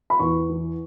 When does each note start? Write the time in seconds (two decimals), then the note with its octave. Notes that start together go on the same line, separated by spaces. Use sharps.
0.10 B5
0.19 E2 C#6
0.49 E3